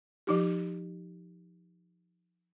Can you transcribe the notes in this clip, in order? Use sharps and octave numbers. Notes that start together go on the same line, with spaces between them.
F3 D#4 G4